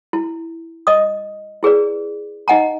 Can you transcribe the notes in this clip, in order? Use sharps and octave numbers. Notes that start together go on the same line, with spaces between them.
E4
D#5 D#6
E4 G#4 B4 D5
D#4 D#5 F#5 G#5 A#5